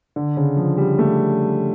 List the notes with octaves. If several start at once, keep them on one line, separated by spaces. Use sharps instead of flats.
D3
C#3
F3
G3
A3